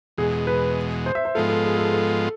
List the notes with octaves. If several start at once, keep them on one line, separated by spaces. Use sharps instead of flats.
E2 B2 G#3 G#4
B4
C5
E5
C5
G#2 F3 G#3 B3 F4 A4
A4
G#4
A4
A4